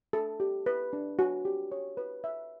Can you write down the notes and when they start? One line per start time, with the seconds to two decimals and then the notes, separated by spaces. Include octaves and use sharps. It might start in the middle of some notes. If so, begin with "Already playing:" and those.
0.13 A4
0.40 G4
0.66 B4
0.93 D4
1.19 F#4
1.45 G4
1.72 C#5
1.97 B4
2.24 E5